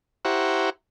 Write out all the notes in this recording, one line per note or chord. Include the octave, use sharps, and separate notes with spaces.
E4 G4 C5 F#5 A#5 C#6